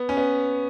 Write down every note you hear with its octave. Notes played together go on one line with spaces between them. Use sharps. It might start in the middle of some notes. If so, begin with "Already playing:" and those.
Already playing: B3
C#4
B3